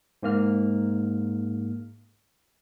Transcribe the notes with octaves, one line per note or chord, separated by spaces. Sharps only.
G#2 A#3 F6